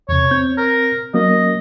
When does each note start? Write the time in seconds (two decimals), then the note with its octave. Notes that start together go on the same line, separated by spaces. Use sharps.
0.09 E2 C3 C#5
0.31 C4 G6
0.58 A#4
1.14 F#3 A#3 C#4 D#5